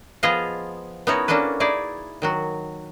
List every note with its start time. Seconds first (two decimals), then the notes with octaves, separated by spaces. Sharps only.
0.23 F3 B3 F4 G#4 D#5 F5
1.07 B3 C#4 D#4 E4 F#4 C#5
1.28 A#3 C#4 D4 F#4 A4 B4
1.60 D#4 E4 G#4 D5
2.22 D#3 F#3 F#4